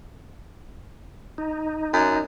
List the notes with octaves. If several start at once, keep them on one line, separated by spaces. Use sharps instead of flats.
D#4
F#2